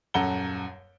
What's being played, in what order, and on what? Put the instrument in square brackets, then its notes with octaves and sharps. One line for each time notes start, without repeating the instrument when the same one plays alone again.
[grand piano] D#1 F#2 A4 F#5 A#5 G7